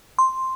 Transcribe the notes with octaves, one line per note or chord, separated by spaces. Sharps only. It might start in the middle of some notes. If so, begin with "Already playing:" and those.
C6